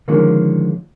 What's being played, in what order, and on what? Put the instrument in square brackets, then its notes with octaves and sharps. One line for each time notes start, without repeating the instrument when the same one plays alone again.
[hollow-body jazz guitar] D3 D#3 F3 G#3 A#3 C#4